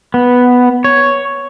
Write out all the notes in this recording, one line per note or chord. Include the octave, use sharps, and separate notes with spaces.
B3
C#5